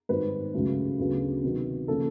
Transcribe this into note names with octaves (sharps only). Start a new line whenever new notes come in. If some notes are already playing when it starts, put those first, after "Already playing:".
G#2 D#3 G3 C4 B4
C#2 C#3 F#3 A3
D2 C#3 F#3 B3
C3 D#3 F#3 B3
C#3 F3 A#3 C#4 A4